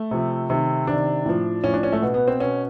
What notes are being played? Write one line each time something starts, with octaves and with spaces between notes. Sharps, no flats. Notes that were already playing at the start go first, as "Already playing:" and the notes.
Already playing: A3
C3 F3
C3 D#3
C3 D#3 D4
A2 F3
A2 F3 C#4
D4
C#4
A3
B2
B3
C4
B2 C#4